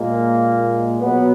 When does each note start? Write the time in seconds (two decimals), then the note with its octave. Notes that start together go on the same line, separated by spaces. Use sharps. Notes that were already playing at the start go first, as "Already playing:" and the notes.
Already playing: A#2 G#3 A#3
1.00 B2 F#3 B3